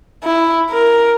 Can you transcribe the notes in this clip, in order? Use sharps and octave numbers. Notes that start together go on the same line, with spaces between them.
E4
A#4